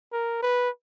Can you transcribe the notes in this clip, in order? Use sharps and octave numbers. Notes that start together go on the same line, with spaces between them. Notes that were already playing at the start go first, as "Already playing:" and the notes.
A#4
B4